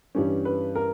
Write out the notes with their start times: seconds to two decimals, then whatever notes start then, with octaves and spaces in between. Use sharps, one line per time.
0.15 G2 E3 G3 C#4
0.45 B4
0.75 A#4